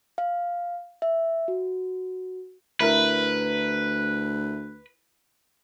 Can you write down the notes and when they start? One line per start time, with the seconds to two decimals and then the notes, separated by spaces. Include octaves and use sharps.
0.18 F5
1.02 E5
1.48 F#4
2.80 D2 E4 A#4 B4